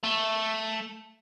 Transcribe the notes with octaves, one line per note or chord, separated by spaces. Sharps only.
A3